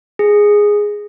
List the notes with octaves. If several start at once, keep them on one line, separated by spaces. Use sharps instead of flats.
G#4